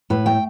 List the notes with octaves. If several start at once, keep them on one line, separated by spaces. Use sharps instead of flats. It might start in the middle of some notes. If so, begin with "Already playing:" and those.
A2 B4
A3 G5